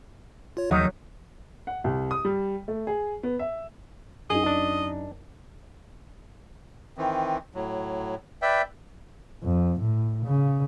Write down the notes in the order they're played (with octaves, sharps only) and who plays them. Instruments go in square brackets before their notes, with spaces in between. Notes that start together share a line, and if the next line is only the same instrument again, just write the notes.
[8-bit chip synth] F4 C#5
[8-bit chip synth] D#2 G6 [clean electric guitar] D#3 A3 D#4 [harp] F#3
[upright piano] F#5
C2
D#6
G3
A3
G#4
B3
E5
[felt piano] F#2 D#4 [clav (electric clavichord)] G#4 [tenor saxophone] D#5
[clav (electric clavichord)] D4
[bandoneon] D#3 E3 C4
A2 F#3
B4 D5 E5 G5
[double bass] F2
A2
C#3